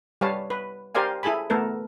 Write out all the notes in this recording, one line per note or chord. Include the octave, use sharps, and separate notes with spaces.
G3 B4 C#5 F5 A5
B4
G4 A#4 C5 D5 F5 G#5
E4 G#4 A4 G#5 B5
A3 B3 A4 A#4